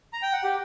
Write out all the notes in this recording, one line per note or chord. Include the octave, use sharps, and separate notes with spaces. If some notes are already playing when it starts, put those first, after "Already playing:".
A#5
G5
F#5
G4